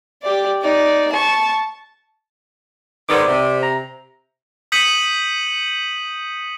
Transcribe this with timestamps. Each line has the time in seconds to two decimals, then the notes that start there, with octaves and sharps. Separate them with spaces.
0.23 G4 D5
0.62 D#4 D5
1.12 A5 C#6
3.09 G#2 D#3 B3 C5 D5 D6
3.28 C3
3.63 A#5
4.72 D#6 G6 B6 C#7 D#7 F#7